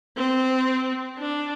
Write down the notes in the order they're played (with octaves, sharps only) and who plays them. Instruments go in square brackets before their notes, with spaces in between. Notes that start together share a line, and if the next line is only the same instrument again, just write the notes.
[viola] C4
D4